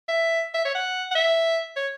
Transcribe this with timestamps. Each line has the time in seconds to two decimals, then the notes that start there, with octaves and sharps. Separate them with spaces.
0.08 E5
0.54 E5
0.65 C#5
0.75 F#5
1.11 F#5
1.15 E5
1.76 C#5